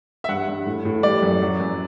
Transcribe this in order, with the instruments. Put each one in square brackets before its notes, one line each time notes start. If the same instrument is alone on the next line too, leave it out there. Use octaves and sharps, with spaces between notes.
[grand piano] E5
G2 F#5
G2
A2
A2
G3 D5
F#2
F#3
F#2